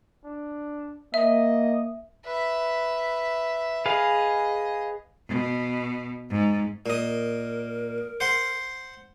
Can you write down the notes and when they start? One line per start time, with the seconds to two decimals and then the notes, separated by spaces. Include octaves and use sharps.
0.25 D4
1.14 A#3 D#5 E5
2.25 B4 E5
3.86 G#4 B4 D#5 F5
5.28 B2
6.30 G#2
6.86 A#2 A#4 D#5
8.20 C5 F#5 C6